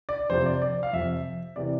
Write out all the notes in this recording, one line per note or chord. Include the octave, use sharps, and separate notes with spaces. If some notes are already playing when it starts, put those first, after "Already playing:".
D5
F2 C3 F3 C5
D5
D5
F5
F2 C3 F3 E5
C3 E3 D5